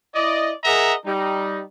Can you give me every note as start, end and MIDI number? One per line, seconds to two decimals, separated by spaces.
0.15 0.52 64
0.15 0.52 74
0.15 0.52 75
0.64 0.94 68
0.64 0.94 70
0.64 0.94 75
0.64 0.94 76
0.64 0.94 78
0.64 0.94 82
1.06 1.62 55
1.06 1.62 63